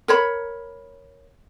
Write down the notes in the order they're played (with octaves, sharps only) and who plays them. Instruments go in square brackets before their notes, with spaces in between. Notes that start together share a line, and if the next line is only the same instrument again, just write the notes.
[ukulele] A#4 C#5 B5